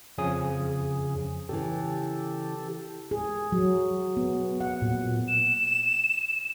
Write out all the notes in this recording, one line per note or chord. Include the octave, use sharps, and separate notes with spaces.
F2 C#3 F3 C#4 G#5 D#6
C#3 E3 G4 A4
G#4
F#3
B3
F#5
A#2
E7